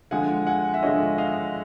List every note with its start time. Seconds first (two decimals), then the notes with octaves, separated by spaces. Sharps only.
0.11 D3 F3 G#3 F#5 G#5
0.47 F#5 G#5
0.74 E5
0.82 D3 F3 G#3 C#5 D#5
1.18 D#5 F5